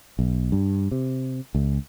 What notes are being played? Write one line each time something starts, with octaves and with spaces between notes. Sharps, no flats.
B1
G2
C3
C#2